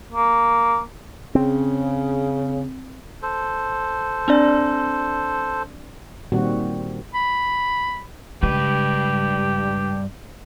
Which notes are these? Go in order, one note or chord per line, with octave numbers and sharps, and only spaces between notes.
A#3
C#3 C4
A4 C5
C4 D4 D5
A#2 D#3 G3 C4 F#4
B5
G2 C#3 G#3 G4 B4